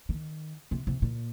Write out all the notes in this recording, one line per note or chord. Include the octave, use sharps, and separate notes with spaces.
D#3
C3
C3
A#2